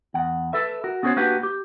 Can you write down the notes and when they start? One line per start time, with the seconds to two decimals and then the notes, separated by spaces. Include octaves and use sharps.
0.14 E2 F#5
0.53 A4 B4 E5
0.84 F#4 A#4
1.03 B3 C#4 F#4 G#4 C5 C#5
1.17 A#3 D4 F#4 G4 B4 F#5
1.43 G4